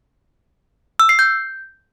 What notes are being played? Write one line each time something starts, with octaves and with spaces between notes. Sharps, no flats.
E6
C7
G6